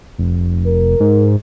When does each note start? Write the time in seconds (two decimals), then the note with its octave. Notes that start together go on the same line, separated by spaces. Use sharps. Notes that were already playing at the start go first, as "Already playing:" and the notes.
0.19 F1
0.65 A#4
1.00 G#2